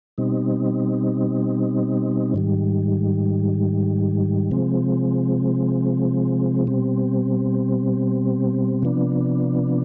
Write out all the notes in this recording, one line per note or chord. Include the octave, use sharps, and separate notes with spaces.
B2 G3 C4 D#4
G#2 D#3 G3
C3 F3 G#3 C4
B2 G3 C4
C3 F3 B3 D4